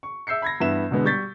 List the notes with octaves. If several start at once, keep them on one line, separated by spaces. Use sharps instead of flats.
C#6
E5 E6 G6 C7 C#7
B5 G#6 A#6
G2 E3 B3 E5 E7
B2 D3 G#3 B3
G3 C#6 G6 A6 B6